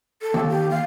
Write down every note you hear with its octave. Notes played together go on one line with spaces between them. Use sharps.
A4
D#2
G4
F5